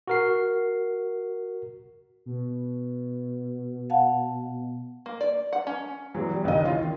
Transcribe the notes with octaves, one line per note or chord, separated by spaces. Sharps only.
F#4 A#4 C7
B2
F5 F#5 A5
A#3
D5
F#5
C#4
E2 E3 F#3 G#3
G3
A#1 D#2 C#3 G3 D#5
E3 C#4 F4
D#3